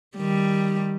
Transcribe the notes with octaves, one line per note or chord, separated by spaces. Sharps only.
D#3 G3